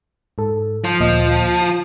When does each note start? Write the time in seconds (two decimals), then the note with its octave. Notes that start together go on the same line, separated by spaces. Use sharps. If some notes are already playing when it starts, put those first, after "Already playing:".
0.38 G#2 A4
0.84 F3
1.00 D2 A#2 D#5
1.62 F4